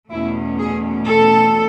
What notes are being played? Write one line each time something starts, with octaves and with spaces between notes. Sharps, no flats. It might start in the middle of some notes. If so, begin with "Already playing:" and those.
E2 B2 A3 C#4 E4
G#4
A4